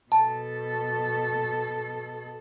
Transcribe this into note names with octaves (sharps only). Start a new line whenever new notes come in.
B2 A4 A5